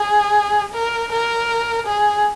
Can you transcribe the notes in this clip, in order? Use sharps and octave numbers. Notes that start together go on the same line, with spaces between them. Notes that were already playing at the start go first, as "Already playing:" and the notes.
Already playing: G#4
A#4
A#4
G#4